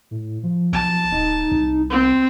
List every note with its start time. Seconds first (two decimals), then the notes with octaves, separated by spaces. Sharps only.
0.11 A2
0.43 F3
0.73 B1 A5
1.12 D1 D#4
1.52 C2
1.90 C4